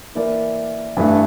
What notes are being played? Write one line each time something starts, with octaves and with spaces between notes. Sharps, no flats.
E3 A#3 E4 A#4 D5
G2 E3 A3 D4